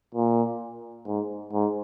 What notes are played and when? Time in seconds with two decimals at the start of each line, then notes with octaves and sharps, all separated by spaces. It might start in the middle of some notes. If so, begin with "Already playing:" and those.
0.14 A#2
1.07 G#2
1.53 G#2